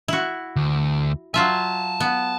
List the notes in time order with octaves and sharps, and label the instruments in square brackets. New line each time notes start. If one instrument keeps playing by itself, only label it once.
[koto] E4 F#4
[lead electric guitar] D2
[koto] F#3 F4 E5 [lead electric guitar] G#5 A5
[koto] B3